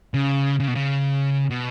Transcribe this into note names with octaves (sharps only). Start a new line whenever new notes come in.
C#3
C#3
B2
C#3
B2